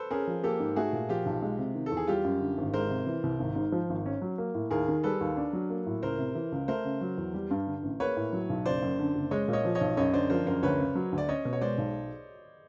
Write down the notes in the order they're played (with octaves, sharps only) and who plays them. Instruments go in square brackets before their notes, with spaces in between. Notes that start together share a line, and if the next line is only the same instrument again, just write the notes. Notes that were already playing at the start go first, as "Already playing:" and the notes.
Already playing: [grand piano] A4 B4 C5
[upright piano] C#4 [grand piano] G#4 A#4
[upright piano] F3
[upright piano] A#3 [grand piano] G4 A4
[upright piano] G#2
[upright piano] A3 [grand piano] F#4 G#4
[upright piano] A#2
[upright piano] F3 [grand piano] F4 G4
[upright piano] B1
G#3
C3
D#3
[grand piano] A4
[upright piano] E2
[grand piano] G#4
[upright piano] G3 [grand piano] F4 G4
[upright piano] F#2
D3
G#1
[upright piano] G#3 [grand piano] A#4 C5
[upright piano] C3
E3
C2
G#1
G#2
F3
G#1
C#4
F#3
A#3
A2
[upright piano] D#2 [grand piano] G#4 A#4
[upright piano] D#3
[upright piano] G3 [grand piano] A4 B4
[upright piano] D#2
D4
F#3
A#3
A2
[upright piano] C#2 [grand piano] A#4 C5
[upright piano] C3
E3
C#2
[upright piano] A3 [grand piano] A#4 C5
[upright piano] C#3
F#3
E2
G3
G2
D3
A1
[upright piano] A#3 [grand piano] B4 C#5
[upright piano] A2
F#3
B1
[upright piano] F#1 [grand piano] C5 D5
[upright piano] F#2
D3
F#1
[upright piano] G#3 [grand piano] C#5 D#5
[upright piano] A#2
[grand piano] C#5 D#5
[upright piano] F3
[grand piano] C#5 D#5
[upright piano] B1
[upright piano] F#2 [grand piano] C#5 D#5
[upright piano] D3 [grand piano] C5 D5
[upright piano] F3 [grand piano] A#4 C5
[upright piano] F#2 [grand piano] A#4 C5
[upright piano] D2 [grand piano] B4 C#5
[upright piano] C#3
F#3
D2
[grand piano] D5
[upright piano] C#4 [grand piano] C#5 D#5
[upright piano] B2
[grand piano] C#5
[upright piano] G#3 [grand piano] C5 D5
[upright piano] B1